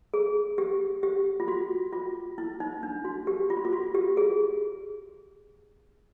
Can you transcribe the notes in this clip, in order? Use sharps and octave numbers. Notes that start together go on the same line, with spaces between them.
G#4
G4
G4
F4
F#4
F4
E4
D#4
D4
F#4
G4
F4
F#4
F4
F#4
G4
G#4